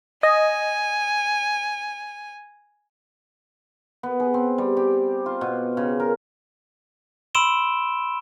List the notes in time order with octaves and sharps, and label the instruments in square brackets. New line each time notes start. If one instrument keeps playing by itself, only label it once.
[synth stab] D#5 [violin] G#5
[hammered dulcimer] B3
G#4
C4
G3
G4
F4
B2
C#3
A#4
[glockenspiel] B5 C6 E6 D7 E7 G7